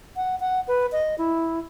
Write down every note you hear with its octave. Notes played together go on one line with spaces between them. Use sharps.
F#5
F#5
B4
D#5
E4